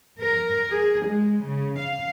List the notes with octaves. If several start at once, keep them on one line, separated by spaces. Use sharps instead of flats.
A#4
G#4
G#3
C#3
F5